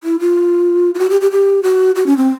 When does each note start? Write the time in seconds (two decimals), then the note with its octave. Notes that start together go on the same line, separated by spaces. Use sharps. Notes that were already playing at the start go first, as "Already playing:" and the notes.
0.04 E4
0.20 F4
0.95 F4
0.99 F#4
1.10 G4
1.21 G4
1.31 G4
1.63 F#4
1.95 F#4
2.06 C#4
2.17 C4